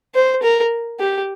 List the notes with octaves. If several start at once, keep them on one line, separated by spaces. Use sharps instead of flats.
C5
A#4
G4